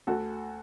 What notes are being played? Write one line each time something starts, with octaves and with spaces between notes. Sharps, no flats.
D2 F#4 A4